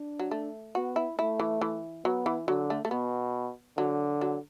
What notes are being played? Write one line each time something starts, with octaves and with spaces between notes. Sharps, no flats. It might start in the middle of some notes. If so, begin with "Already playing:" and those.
Already playing: D4
F#3
A3
B3 F#4
E4
A3 E4
E3
E3
F#3 B3
E3
D3 F#3
A3
A3
B2 B3
D3 F#3
F#3